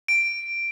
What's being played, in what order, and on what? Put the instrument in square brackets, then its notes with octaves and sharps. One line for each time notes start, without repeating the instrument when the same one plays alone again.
[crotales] D7